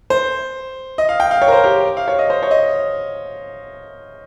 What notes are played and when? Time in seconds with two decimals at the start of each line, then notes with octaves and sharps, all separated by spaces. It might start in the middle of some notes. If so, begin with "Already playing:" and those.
0.10 C5
0.98 D#5
1.09 F5
1.20 G5
1.31 F5
1.42 C#5
1.48 A#4
1.52 C5
1.64 G4
1.97 F5
2.08 C#5
2.19 D#5
2.30 C5
2.43 C#5
2.51 D#5